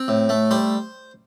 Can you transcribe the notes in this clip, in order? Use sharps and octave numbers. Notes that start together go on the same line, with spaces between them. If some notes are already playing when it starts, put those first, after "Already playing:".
Already playing: C4
A2
A3
G3 C5